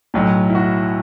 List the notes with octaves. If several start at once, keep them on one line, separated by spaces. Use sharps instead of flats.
B1 A2 F#3
E4
F#4